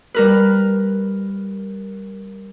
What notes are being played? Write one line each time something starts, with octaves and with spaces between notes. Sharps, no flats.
G3 A#4 B4